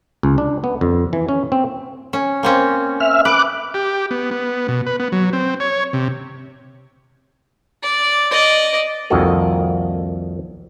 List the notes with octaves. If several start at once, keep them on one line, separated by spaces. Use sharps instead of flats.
C#2
D4
B3
F2
E3
C#4
C4
C#4
A#3 C4 C#4
E5 F6
B4 D6 F#6
G4
B3
B3
B2
B4
B3
F#3
C4
C#5
C3
D5
D5 D#5
C2 F2 D#3 A#3 F#4 A4